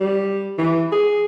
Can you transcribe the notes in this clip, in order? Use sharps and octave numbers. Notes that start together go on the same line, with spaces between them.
G3
E3
G#4